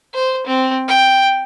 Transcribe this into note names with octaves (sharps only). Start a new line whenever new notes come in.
C5
C4
G5